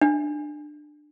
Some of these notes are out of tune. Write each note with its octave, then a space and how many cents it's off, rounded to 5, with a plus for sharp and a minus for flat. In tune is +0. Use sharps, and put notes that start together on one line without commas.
D4 +20